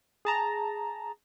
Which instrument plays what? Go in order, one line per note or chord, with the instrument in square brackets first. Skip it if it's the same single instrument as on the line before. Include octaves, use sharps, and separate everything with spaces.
[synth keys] G#4 A5 A#5